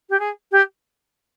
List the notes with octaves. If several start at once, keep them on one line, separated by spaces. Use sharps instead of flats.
G4
G#4
G4